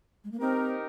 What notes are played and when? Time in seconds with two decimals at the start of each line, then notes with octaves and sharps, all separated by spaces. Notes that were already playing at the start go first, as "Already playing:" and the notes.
0.24 G#3
0.32 A#3
0.40 C4 D#4 G4 A#4